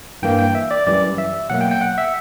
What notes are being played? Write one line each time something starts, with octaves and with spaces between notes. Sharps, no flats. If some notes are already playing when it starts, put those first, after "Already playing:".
G2 E3 A#3 G5
G5
E5
D5
F#2 E3 G3 D5
E5
B2 F#3 A#3 F#5
G5
G5
F#5
E5